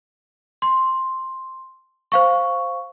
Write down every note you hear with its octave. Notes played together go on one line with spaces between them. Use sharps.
C6
C5 F5 C#6